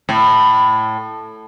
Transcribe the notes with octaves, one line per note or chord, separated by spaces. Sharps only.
A2